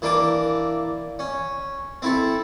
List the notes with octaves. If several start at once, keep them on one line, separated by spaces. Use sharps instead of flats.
E3 A#3 D4 D6
C#4
C4 E4 A4